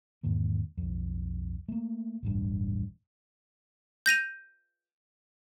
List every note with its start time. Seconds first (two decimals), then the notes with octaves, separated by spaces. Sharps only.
0.23 E2 G#2 D#3 A#3
0.77 B1 F2
1.68 A3 A#3
2.23 E1 A1 G2
4.06 G6 A#6 D#7 F7